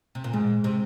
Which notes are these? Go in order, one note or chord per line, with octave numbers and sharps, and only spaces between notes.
C3
A#2
G#2 G#3
C3